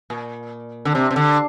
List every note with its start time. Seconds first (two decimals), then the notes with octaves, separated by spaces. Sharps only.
0.10 A#2
0.85 D3
0.95 C3
1.11 C3
1.16 D3